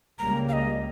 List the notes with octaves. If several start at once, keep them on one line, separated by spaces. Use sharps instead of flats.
C#2 C#3 G3 A#3 A#5
F5
D#5